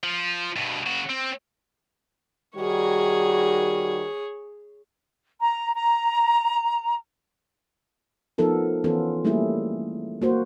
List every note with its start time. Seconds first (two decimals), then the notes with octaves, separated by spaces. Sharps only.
0.03 F3
0.56 G2 B2
0.86 C#3 F#4
1.09 C4
2.56 D#3 G3 F#4 G#4 C#5
5.41 A#5
5.75 A#5
8.38 F3 B3 D#4 A4 A#4
8.84 E3 B3 C#4 F4 A4
9.25 G3 A3 A#3 C#4 E4 G#4
10.22 A#3 F#4 C5